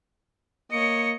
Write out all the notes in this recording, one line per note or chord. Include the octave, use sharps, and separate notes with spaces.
A#3 C#5 D#5 C#7